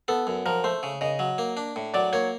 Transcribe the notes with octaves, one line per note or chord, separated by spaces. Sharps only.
B3 A4
F#2
F3 A#4
A3 C5
C#3
C#3 D#5
F#3
A#3
D4
A2
F#3 D5
A#3 C#5